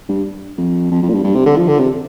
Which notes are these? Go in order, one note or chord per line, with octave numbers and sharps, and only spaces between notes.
G2
F2
F2
F2
A#2
G2
G2
C3
D3
F3
D3
C3